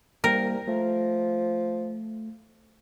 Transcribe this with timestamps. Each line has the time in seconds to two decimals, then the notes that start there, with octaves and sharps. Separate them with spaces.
0.24 C2 G3 A#3 A#4 G5
0.68 F3 A3